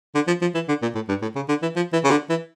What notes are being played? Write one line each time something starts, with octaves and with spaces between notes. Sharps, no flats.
D3
F3
F3
E3
D3
A#2
A2
G2
A2
C#3
D3
E3
F3
E3
C#3
D3
E3